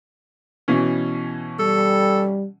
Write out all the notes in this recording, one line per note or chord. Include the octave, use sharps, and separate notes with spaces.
B2 E3 C#4
G3 A4